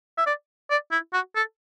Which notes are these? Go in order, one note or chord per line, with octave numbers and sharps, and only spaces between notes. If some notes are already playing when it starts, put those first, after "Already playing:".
E5
D5
D5
E4
F#4
A4